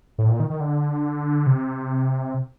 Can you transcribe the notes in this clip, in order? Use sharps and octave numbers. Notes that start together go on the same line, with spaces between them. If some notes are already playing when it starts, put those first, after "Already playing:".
A2
A#2
D#3
D#3
D3
C3